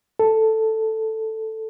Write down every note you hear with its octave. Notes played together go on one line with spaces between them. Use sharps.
A4